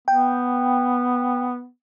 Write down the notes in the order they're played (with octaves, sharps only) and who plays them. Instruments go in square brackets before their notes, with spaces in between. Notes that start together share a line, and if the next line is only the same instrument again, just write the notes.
[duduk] B3 [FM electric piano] G5